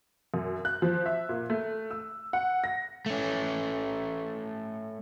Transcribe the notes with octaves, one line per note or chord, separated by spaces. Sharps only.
F#2
F#6
F3
E5
A#2
A3
E6
F#5
A#6
A3 C#4